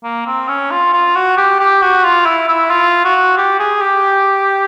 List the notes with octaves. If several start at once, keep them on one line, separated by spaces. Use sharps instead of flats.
A#3
C4
C#4
F4
F4
F#4
G4
G4
F#4
F4
E4
E4
F4
F#4
G4
G#4
G4